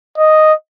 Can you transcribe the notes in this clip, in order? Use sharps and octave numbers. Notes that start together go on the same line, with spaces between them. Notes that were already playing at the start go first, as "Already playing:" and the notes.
D#5